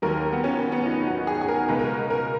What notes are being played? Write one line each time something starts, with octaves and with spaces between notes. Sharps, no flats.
D#2 D#3 F#3 A#4
B3
C#4
C#4
B3
D#4
F#4
G#4
G#4
A#4
C#2 B2 G#3 B4
A#4
A#4